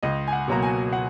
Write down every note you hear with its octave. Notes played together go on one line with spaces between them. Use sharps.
C#2 D#5
G#5
F#5
B2 F#3 A#3 A#5
G#5
F#5